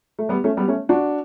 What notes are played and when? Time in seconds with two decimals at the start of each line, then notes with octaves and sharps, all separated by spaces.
0.19 A3
0.29 G3 B3
0.44 A3 C#4
0.57 G3 B3
0.68 A3 C#4
0.89 D4 F#4